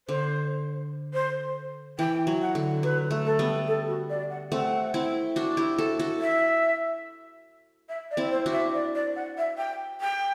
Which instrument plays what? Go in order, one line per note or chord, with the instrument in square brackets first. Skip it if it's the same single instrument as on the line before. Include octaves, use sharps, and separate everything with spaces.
[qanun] D3 [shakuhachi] C5
[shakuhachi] C5
[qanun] E3 [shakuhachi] G5
[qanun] F#3
[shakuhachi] F#5
[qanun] D3
[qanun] F#3 [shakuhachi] B4
[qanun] A3
[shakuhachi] A4
[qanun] G3 B3
[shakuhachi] A4
F#4
D5
F#5
[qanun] A3 C4 [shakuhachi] F#5
[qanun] C4 E4
D4 F#4
E4 G4
F#4 A4
F#4 A4
[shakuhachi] E5
E5
D5
[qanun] C4 E4
[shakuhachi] C5
[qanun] D4 F#4
[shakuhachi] E5
D5
D5
F#5
E5
G5
G5